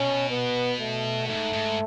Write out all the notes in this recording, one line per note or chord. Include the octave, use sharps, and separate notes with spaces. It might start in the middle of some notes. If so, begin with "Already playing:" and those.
Already playing: B2 C#4
B3
A3
G#2 A3
G#2